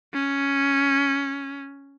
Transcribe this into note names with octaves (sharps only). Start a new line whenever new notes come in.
C#4